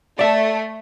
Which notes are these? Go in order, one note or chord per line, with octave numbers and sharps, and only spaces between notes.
A3 D5 E5